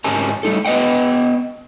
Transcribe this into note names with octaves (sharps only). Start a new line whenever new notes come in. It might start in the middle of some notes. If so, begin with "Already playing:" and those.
G#2 C#4 G4 A#4 G#5 A5
G3 A3 D#4 A4
B3 B4 D#5 F#5 G5